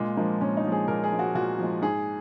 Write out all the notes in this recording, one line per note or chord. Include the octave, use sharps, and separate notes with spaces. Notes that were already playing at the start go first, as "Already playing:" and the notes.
Already playing: A#2 G#3
F3 G#3 A#3
A#2 C#4
D#4
F3 G#3
G#4
A#2 A#4
G#4
F3 G#3
F#4
A#2 F#4
F3 G#3
G#2 G#4